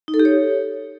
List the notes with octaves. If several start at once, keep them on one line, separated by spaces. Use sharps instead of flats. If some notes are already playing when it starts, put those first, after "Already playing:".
D#4
A4
G4
C#5